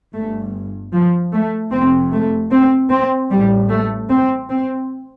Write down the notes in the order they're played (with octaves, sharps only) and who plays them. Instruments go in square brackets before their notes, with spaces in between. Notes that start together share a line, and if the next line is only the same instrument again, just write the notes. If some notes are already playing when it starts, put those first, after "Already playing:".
[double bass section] G1 G2 A3
F3
A3
F1 F2 C3 C4
A3
C4
C4
A1 A2 G3
A3
C4
C4